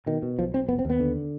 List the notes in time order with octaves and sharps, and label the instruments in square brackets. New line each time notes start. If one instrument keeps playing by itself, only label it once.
[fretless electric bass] B2 D#3
B2
B1 F3
B1 C4
F1 B3
C4
D#2 B3
D3